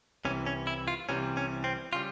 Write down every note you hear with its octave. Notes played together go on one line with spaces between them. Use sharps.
C2 C3 E3 C#4
C#4
E4
F4
C2 C3 E3 G3 C#4
C#4
C4
C#3 G3 F4